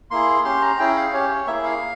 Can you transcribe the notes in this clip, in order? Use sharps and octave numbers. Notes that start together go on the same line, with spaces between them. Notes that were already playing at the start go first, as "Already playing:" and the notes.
A#3 E4 G#4 C6
C#4 G4 C6
A#5
C#4 E4 G#4 G5
F5
C#4 G4 C#5
C#5
A#3 E4 G#4 E5
F5